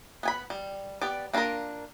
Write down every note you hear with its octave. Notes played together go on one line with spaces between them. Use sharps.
B3 G#5 B5
G3
B3 G4 D5
A#3 D4 E4 F4 A#4